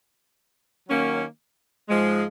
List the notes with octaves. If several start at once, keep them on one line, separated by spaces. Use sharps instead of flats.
D#3 F#3 A#3 C#4
G#2 F3 G#3